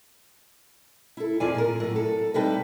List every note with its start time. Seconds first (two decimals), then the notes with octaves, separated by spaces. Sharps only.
1.17 E4 A4
1.40 F2 F3 E4 G#4 D5 G#5
1.55 A#2 A4 A#4
1.80 A2 F#3
1.96 A4
2.34 C3 G3 D#4 B4 G5 A5